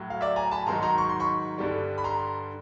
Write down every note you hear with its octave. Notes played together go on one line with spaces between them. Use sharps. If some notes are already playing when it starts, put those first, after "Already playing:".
Already playing: A2 F#3
F5
D5 E5
G#5 A#5
A5 B5
G#2 D#3 F#3 A#5 C6
A#5 C6
C#6
C6
B5 C#6
G2 D3 G3
B5
A#5 C6